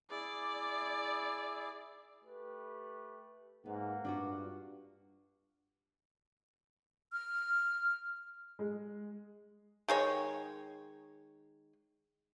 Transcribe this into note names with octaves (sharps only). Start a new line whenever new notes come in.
E4 G#4 D5
A3 G4 B4
G#2 A#3 B3 F#5
G2 D4 F4 F#4
F6
G#3
D#3 G#3 C#5